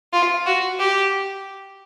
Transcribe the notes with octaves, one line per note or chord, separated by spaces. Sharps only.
F4
F#4
G4